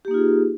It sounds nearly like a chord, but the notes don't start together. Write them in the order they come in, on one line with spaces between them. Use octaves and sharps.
G4 A#3 D#4 F4 G#4